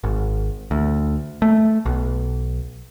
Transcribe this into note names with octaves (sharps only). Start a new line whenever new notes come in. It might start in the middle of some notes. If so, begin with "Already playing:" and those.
G#1
D2
A3
B1